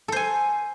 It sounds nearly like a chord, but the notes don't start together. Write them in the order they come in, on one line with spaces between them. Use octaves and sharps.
A4 C5 G#5